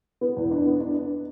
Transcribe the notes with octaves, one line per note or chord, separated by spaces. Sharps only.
B3
E2
D4
B3
D4
D4